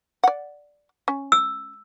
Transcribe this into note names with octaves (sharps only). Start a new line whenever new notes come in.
D5 F#5
C#4
E6